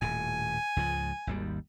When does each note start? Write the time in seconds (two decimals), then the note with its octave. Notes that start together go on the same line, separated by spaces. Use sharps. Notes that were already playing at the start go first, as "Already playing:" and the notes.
0.02 D#1 A2 G#5
0.76 C#2 G#2 F3
1.27 G#1 D#2 G3